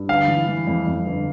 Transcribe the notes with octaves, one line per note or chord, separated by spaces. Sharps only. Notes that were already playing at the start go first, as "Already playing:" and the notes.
Already playing: G2
G1 F5
E3
E3
F2
F2
G1